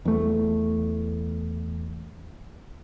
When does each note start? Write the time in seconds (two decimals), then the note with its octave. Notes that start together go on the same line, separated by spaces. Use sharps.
0.05 E2 A3